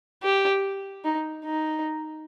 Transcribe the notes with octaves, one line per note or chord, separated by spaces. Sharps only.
G4
D#4
D#4